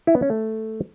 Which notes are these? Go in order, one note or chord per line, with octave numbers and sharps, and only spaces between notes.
E4
B3
C#4
A3